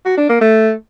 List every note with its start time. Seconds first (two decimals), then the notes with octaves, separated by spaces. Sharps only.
0.05 F#4
0.17 D4
0.29 A#3
0.41 A3